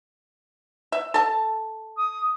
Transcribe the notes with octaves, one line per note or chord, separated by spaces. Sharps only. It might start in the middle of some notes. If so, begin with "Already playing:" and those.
E5
A4 A5
D#6